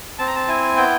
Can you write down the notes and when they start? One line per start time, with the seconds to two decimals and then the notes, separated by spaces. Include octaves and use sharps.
0.19 C4 A5
0.27 A#5
0.36 A5
0.48 E4 G#5
0.77 B3 G5